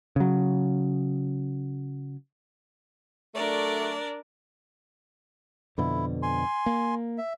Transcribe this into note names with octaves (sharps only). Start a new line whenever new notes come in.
C#3 F#3
F#3 A3 D4 A#4 D5
F2 B2 D3 E4
G#5 C6
A#3
E5